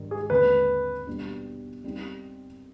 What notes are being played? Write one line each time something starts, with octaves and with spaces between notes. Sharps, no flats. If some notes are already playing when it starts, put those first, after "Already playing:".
Already playing: G#2 D#3 G3 D4
G#4
D#2 D3 G#3 C4 B4
B2 G3 D4
G3 C4 D#4 G4